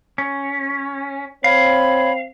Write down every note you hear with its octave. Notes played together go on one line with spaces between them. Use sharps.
C#4
C4 C#5 F5 B5